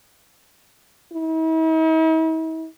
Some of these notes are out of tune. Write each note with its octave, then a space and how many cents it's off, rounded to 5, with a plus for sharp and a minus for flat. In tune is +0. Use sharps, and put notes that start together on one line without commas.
E4 -45